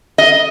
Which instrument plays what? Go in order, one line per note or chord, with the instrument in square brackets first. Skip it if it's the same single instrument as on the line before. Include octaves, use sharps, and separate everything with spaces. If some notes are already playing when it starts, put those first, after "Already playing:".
[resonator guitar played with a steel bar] D#5